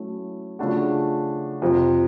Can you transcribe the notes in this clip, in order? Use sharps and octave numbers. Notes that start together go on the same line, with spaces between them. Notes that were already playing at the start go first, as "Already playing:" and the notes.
Already playing: F#3 A3 C#4 E4
C#3 F3 A3 D4 F#4
F2 C3 F3